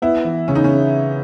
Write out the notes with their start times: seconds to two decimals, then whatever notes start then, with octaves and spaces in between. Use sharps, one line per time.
0.02 B3 E4
0.25 E3
0.48 C#3 C#4
0.55 D#4
0.64 C#4